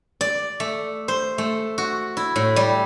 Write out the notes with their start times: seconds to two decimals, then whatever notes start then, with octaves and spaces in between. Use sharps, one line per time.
0.21 D5
0.60 A3
1.08 C5
1.38 A3
1.78 F#4
2.17 E4
2.36 A2
2.56 G3